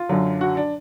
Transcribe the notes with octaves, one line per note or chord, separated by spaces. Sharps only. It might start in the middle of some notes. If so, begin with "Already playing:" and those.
Already playing: F4
F#2 D3 F#3
F#4
D4